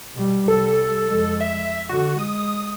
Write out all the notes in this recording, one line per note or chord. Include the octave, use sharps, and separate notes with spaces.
B2 G3
C2 G3 A4
F2 G#3
E5
D3 F#4
G#3 D#6